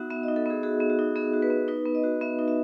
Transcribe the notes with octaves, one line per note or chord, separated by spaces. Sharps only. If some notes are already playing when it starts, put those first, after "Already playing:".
Already playing: B3 D#4 F#4 E5 F#5
B3 E5
D#5
D#4
A4
B3 G#4
F#4 G#4
B3
F#4
D#4
B3 G#4
F#4
B4
B3
D#4 B4
B3
D#5
F#4
B3 E5
D#4
E5